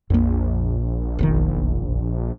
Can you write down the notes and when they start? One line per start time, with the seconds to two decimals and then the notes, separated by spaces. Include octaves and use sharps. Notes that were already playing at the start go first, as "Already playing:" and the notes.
0.10 A#1 F2 A#3
1.19 F1 B1 D#3